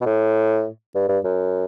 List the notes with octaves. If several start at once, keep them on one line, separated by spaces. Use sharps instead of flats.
B2
A2
G2
G2
F#2